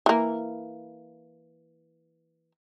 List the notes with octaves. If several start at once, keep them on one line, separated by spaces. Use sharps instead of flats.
E3 A#3